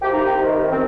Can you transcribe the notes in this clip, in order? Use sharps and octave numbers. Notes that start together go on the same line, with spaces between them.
C2 C3 F3 G4
D#4
C2 C3 D#3
D#3 C4